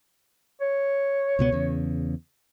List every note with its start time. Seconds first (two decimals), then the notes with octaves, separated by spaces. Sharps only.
0.61 C#5
1.39 C#2 B2 B3
1.52 E2 C#3